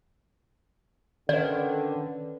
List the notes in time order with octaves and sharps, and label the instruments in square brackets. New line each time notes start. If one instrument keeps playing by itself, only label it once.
[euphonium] D3 [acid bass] D#3 [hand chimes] C#4 B4 [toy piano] D5